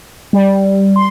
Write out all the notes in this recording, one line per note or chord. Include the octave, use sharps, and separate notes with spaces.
G3
C6